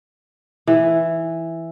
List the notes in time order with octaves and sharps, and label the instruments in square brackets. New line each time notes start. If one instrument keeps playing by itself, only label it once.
[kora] E3